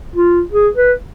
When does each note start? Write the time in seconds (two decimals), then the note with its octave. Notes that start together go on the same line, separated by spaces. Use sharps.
0.16 F4
0.52 G#4
0.76 B4